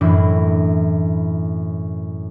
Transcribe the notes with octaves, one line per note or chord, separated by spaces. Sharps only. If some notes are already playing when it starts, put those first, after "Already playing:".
F#2 A2 E3 D4 E4